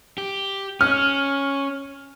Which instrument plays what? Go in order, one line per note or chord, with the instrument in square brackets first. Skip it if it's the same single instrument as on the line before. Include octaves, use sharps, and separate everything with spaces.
[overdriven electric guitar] G4
[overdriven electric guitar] C#4 [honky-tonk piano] F6